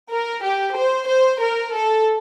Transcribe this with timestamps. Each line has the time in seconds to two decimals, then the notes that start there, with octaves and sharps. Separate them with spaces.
0.10 A#4
0.43 G4
0.75 C5
1.08 C5
1.41 A#4
1.74 A4